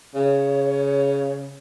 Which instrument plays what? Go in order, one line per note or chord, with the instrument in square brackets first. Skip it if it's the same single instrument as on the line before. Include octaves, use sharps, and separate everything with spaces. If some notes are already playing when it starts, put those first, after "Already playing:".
[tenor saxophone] C#3 [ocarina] C#5